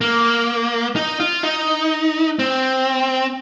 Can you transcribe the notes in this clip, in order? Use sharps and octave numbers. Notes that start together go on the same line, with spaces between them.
A#3
D#4
F4
D#4
C4